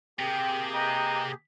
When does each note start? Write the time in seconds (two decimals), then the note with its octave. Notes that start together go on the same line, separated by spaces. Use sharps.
0.19 C3 A#3 G4 G#4 G5
0.75 B4 D#5 G5 A#5